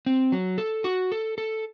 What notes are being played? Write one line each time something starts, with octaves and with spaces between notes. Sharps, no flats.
C4
F#3
A4
F#4
A4
A4